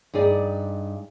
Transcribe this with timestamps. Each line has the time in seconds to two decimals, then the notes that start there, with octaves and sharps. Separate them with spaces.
0.14 G2 D#4 G#4 D5